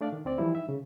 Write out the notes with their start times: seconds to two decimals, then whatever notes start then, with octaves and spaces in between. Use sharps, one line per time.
0.01 A3 D4 D5 F5
0.13 D#3
0.25 D2 C4 D5
0.38 E3 F3 G3 E4
0.55 D#4 E5
0.69 C#3